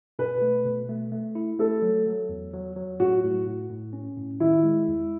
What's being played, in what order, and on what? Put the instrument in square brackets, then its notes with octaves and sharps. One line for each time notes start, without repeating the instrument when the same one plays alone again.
[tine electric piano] B2 [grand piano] B4
[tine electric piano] A3
B2
A3
A3
E4
[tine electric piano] A3 [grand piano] A4
[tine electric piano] F#3
F#3
E2
F#3
F#3
[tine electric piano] A2 [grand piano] F#4
[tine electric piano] A2
A2
A2
C#4
A2
[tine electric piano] D#3 [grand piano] E4
[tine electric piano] G#3
E2